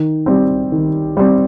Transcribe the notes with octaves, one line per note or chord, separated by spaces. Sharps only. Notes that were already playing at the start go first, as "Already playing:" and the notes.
Already playing: D#3
G3 C4
D#3
G3 C4